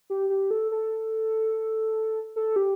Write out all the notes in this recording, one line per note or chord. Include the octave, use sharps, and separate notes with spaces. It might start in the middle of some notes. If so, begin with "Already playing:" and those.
G4
G4
A4
A4
A4
G4